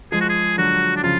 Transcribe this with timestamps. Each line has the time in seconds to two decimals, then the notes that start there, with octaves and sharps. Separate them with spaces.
0.12 F3 G#3 G#4
0.21 F#4
0.29 G#4
0.58 D3 F#3 F#4
0.96 D4
1.03 C#3 F3 F4